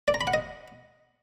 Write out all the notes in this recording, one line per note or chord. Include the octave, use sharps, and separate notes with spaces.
D5
A#5
B5
F#5
D#5